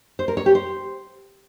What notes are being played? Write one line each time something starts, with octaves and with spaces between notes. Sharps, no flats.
C5
A#4
C#5
G4
C5